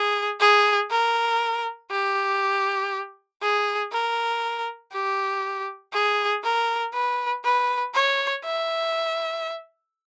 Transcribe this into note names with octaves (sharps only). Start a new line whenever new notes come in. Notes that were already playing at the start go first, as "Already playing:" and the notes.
Already playing: G#4
G#4
A#4
G4
G#4
A#4
G4
G#4
A#4
B4
B4
C#5
E5